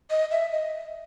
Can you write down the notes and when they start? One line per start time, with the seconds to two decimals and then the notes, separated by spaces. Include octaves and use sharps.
0.10 D#5
0.31 E5
0.52 D#5